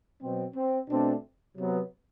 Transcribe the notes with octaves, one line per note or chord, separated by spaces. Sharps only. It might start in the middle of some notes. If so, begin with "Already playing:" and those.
B2 F#3 C4
C4
B2 A3 C4 D4
C3 F#3 B3